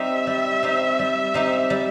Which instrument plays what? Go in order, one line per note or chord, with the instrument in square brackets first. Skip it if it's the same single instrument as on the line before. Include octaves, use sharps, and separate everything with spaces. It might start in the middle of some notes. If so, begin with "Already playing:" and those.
Already playing: [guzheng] G3 C4 D#4 G4 [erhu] E5
[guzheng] G3
C4 D#4 G4
G3
C4 D#4 G4
G3